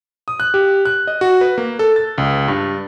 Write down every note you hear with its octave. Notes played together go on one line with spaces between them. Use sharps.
D#6
F#6
G4
F#6
D#5
F#4
B4
A#3
A4
A6
C#2
G2